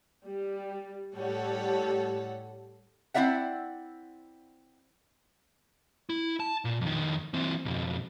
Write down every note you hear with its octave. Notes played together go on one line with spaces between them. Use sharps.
G3
A2 G3 A4 C#5 F#5
C4 E4 D5 E5 F#5
E4
A5
A#2
F2 D#3
E3 C4
B1 F2